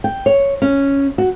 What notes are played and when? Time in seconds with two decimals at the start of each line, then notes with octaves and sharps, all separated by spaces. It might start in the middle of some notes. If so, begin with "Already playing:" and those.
0.04 G5
0.26 C#5
0.62 C#4
1.18 F#4